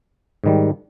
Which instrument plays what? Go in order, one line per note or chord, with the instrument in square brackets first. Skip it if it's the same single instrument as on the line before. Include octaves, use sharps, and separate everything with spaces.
[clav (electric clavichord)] G#2 D#3 G3